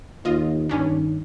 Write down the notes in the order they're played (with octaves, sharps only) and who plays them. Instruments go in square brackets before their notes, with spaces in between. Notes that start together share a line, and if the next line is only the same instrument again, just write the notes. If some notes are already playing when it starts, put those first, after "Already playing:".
[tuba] D#2 [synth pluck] F4 D#5
[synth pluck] G2 C#4 D4 [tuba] D#3